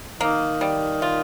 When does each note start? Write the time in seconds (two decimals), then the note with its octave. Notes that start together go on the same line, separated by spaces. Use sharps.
0.21 D#3 A#3
0.61 G3
1.02 F4